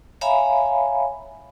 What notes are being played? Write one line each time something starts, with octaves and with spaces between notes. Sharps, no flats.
C#5 E5 F5 G#5 A#5 B5